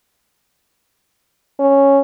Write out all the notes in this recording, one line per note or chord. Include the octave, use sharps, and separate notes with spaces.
C#4